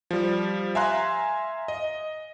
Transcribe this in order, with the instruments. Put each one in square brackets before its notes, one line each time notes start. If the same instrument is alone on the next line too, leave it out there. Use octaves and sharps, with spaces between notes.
[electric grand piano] F3 G3
E5 F5 G#5 A#5 C6 F#6
D#5